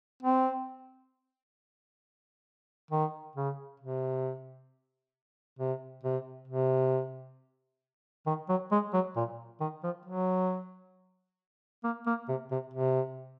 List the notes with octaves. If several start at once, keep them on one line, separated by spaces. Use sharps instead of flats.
C4
D#3
C#3
C3
C3
C3
C3
D#3
F#3
G#3
F#3
A#2
D#3
F3
F#3
A#3
A#3
C3
C3
C3